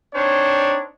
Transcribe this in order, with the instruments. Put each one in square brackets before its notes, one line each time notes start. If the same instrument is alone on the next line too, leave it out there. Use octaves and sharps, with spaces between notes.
[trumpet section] C4 D4 D#4 C5 C#5